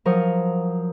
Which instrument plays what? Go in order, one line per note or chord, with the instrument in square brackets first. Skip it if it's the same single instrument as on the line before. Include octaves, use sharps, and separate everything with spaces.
[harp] F3 F#3 A#4 C5 C#6 D#6